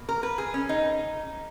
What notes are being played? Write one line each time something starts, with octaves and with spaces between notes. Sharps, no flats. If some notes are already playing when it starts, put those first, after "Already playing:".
Already playing: B2 A#3
A#4
B4
G#4
C#4
D#4